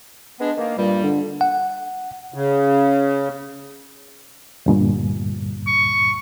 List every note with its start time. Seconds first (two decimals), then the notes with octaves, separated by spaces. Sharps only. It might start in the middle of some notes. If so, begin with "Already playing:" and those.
0.40 G#3 B3 D4
0.58 D#3 A#3
0.77 G2 A#2 G3
1.04 D3
1.41 F#5
2.34 C#3
4.66 D2 G2 A#2
5.67 C#6